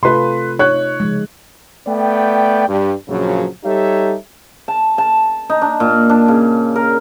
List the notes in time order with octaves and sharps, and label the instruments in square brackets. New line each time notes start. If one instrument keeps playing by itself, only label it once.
[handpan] C3 A3 F4 [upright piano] A4 B4 C6
[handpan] D#4 [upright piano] C#5 F#6
[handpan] C#3 F3 G#3
[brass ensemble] A3 B3 D5 G5
G2
A#1 F#2 C#3 F3 F#3
G3 D#4 G4 A4 C#5 E5
[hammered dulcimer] A5
A5
D#4
D4
A#2
D4
C#3
A#4